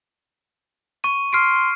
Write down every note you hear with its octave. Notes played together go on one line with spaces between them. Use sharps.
C#6 D#7
C6 F6 C7 D7